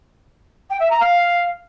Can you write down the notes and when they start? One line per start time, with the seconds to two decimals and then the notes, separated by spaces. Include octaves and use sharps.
0.70 G5
0.80 E5
0.90 A#5
1.00 F5